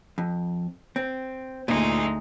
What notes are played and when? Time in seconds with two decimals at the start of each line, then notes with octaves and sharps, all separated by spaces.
0.18 F2
0.96 C4
1.68 D2 A#2 G#3 D#4